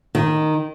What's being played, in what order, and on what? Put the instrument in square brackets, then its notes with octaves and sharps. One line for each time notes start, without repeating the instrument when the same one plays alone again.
[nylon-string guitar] D#3